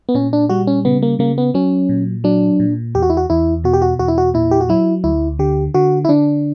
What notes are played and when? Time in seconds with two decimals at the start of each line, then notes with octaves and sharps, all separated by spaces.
0.09 B3
0.15 A#2 C#4
0.33 D4
0.49 G3 F#4
0.67 C#4
0.85 C#3 B3
1.02 A#3
1.19 C#3 A#3
1.38 B3
1.54 F#3 C#4
1.89 A#2
2.24 F#3 D4
2.60 A#2
2.95 E2 G4
3.03 F#4
3.10 E4
3.17 F#4
3.30 E2 E4
3.64 B2 F#4
3.73 G4
3.82 F#4
3.99 E2 F#4
4.08 E4
4.18 F#4
4.34 A#2 E4
4.51 G4
4.61 F#4
4.69 F#3 E4
5.04 D2 E4
5.39 D3 G4
5.74 D3 F#4
6.05 E4
6.09 D3 D4